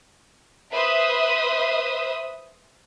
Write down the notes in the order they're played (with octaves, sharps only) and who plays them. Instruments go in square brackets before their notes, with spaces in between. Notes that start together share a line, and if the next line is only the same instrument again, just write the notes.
[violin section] B4 C5 E5 D#6